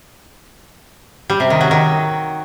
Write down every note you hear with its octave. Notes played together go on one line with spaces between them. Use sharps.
G3
C3
D#3
F#3
D#3